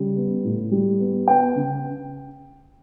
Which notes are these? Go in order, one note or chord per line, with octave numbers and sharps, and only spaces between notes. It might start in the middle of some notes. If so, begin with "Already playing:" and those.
Already playing: C#3 G3
B3
A2
G3
B3
B3 G5
C#3